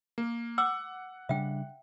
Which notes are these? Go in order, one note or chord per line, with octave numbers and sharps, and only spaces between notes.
A#3
F#5 D6 E6
C#3 G3 D4 E5 G5